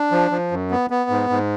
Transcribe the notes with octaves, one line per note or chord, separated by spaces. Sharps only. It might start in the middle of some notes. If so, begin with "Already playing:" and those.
Already playing: D4
F3
F3
F#2
B3
B3
G#2
G#2